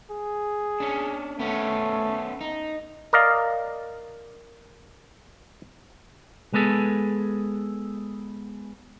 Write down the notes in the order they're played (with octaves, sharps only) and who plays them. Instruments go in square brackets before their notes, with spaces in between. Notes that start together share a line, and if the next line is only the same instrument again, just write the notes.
[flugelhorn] G#4
[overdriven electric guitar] C#4 D4
[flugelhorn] A3 [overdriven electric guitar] B3 C#4
[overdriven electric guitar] D#4
[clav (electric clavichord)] A#4 D5 D#5 F5
[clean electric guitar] G#3 B3 G#4 A4